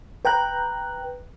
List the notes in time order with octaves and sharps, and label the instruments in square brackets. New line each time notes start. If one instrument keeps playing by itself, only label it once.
[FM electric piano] B4 G5 A#5 F#6